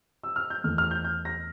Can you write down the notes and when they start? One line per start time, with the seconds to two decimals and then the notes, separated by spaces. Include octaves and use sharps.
0.23 E6
0.36 F6
0.50 G6
0.64 E2 E3 A3 F6
0.78 F6
0.91 G6
1.04 G6
1.25 A#6